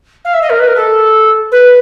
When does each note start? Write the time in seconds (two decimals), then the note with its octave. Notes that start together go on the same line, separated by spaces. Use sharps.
0.24 F5
0.33 E5
0.41 D#5
0.49 A#4
0.59 B4
0.67 A#4
0.75 A4
1.51 B4